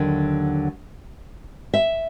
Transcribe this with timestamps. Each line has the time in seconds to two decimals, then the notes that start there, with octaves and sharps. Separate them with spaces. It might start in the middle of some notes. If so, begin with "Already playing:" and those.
Already playing: D#2 D3 F#3
1.74 E5